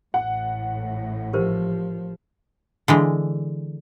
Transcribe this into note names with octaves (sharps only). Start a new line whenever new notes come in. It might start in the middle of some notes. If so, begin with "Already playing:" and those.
A1 A2 F#5
F3 G4 A#4 C5
D3 E3 G#3